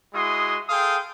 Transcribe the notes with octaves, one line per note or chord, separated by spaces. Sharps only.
G#3 E4 F#4 C6 D#6
G#4 A4 F5 G5 C6 D#6